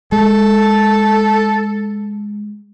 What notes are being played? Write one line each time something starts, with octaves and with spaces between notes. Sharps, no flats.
G#3 A4